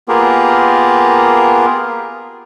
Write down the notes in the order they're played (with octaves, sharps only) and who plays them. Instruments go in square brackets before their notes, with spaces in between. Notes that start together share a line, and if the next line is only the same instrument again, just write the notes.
[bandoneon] A#3 B3 F4 G4 G#4 A#4